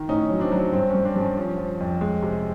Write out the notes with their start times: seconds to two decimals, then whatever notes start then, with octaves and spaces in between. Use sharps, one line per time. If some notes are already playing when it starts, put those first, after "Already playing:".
Already playing: D#3
0.08 A2 C#4 D#4
0.30 F#3
0.40 C4 D4
0.52 F#3
0.72 G2 C4
0.89 C#4
0.95 G2
1.05 C4 D4
1.16 G2
1.21 C#4
1.37 F3
1.58 F3
1.80 F2
2.01 G#3
2.22 C3